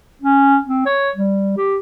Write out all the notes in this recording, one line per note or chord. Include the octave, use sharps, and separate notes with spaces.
C#4
C4
C#5
G3
G4